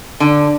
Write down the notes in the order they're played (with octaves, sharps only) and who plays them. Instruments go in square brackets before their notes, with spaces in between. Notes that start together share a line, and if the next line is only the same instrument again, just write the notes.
[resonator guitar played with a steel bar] D3